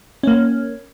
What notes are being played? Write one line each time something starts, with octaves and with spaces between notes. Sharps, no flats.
A#3 C#4